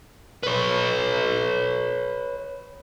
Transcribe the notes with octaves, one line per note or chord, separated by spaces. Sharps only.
B4 C#5